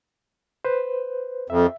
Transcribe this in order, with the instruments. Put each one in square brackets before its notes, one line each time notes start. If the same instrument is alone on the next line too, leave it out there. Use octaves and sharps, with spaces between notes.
[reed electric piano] B4 C5
[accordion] F2 [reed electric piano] E5